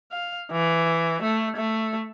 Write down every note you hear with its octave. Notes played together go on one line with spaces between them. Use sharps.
F5
E3
A3
A3